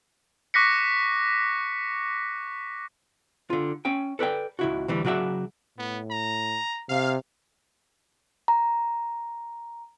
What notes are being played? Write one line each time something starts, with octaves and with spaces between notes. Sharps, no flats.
C#6 D6 F#6 A#6 B6 C#7
D3 F4
C#4 G5
A4 B4 D5 G5
C#2 E4 F#4
D2 E3 G3
C#3 F#3 F#4 D5 E5
A2 B3
A#5
C3 F5
A#5